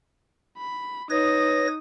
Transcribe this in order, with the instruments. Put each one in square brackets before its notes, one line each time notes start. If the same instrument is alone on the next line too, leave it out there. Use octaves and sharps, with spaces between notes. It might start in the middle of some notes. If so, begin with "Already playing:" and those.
[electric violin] B5
[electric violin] D#4 D#6 [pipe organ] B4 C#5 A#6